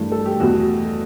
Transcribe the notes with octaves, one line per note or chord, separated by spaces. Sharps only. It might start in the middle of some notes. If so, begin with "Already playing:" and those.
Already playing: G2 E3 A3
A4
G4
E2 B2 A3 F#4